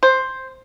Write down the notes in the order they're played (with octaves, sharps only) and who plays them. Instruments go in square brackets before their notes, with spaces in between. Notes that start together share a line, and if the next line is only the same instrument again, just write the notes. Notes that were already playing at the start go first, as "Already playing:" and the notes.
[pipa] C5